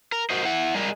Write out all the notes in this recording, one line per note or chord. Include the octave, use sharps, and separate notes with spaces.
A#4
F#4 A#4 C5 D#5
E4 F#5
G3 G#3 A#4